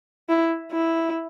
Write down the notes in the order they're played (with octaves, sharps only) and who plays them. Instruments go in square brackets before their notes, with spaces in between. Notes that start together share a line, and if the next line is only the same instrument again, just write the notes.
[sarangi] E4
E4